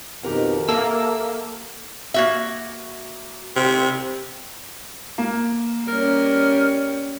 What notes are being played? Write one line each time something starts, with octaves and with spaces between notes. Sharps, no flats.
F2 B2 D#3 G4 A#4 F#5
A#3 A4 E5 A#5
A#3 F#4 E5
C3
A#3
G3 C#4 A#4